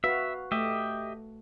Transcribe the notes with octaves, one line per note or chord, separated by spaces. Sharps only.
F#4 B4 E5 F5
A3 G4 D#5 E5